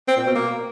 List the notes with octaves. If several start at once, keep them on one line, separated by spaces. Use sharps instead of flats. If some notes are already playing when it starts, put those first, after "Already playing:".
C4
A#2
B2
A#3